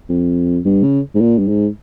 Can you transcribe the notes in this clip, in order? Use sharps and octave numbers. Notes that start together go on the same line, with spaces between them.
F2
G2
C#3
G#2
A#2
G2
G#2